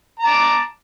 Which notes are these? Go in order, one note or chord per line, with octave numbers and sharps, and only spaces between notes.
A5 A#5 D6